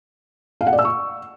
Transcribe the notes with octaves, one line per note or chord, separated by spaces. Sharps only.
F5
F#5
D5
E6
C#6